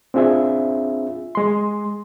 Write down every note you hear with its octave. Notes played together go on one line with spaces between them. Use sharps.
C4 D4 F4 G#4 E5
G#3 C6